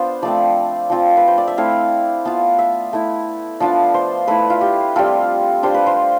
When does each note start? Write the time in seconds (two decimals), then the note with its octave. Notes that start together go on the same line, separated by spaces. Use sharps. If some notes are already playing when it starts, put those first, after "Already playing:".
Already playing: B3 D4 F4 C5
0.22 F3 A3 C4 D5
0.90 F3 C4 F4
1.17 B4
1.27 C5
1.38 D5
1.48 E5
1.57 A3 C4 E4 F5
2.25 B3 F4 A5
2.59 E5
2.93 A3 E4
3.60 F3 B3 D4 F4 D5
3.94 C5
4.27 A3 E4 B4
4.50 F4
4.61 G4
4.96 G3 C4 F4 A4
5.63 G3 D4 F4 C5
5.74 B4
5.86 C5